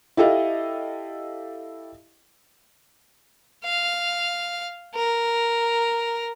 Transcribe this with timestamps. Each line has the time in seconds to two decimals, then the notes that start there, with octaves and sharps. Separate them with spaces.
0.17 E4 G4 A4 D#5 F5
3.64 F5
4.95 A#4